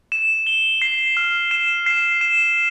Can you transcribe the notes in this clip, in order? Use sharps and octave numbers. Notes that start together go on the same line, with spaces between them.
E7
G7
C7
F6
E7
C7
E7